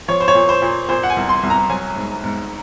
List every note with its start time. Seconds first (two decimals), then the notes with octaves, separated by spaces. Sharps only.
0.08 F3 C#5
0.21 C5
0.28 C#5
0.35 A#2
0.49 C5
0.62 A#2
0.89 A#2 C5
1.03 F#5
1.10 G#5
1.16 C2
1.29 C6
1.43 C2
1.50 A#5
1.70 F#3 G#5
1.96 G#2
2.24 G#2